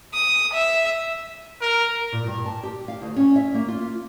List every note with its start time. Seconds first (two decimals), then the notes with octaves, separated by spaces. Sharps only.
0.14 D#6
0.53 E5
1.61 A#4
2.13 A#2
2.27 G2
2.46 A5
2.63 G4
2.88 F5
3.02 D2
3.16 C#4
3.36 E5
3.54 A#3
3.68 F4